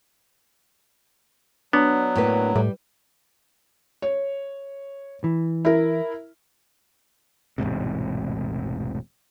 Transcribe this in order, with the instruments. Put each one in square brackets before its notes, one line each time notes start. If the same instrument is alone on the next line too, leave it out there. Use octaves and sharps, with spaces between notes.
[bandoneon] F#3 [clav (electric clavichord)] B3 [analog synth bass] D4
[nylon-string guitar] A2 A#3 B4
[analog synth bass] A2 [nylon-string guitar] G3
[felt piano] C#5
[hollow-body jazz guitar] E3
[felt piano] E4 A#4
[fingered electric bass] E1 A1 G#2 C3